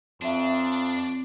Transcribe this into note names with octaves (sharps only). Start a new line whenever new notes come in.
F2 C4 D4 C#5 E5 F5